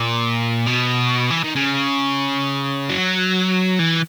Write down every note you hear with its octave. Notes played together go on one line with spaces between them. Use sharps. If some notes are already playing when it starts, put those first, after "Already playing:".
Already playing: A#2
B2
E3
D#3
C#3
F#3
E3